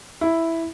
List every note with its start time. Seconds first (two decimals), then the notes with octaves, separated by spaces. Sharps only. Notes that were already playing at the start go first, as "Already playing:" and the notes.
0.21 E4